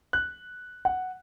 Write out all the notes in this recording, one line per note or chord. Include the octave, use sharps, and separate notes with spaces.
F#6
F#5